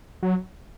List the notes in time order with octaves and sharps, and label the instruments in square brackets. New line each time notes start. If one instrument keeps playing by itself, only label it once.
[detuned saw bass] F#3